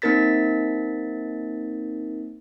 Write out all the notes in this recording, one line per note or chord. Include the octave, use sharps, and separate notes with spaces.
A#3 C4 D#4 A#4 A6 B6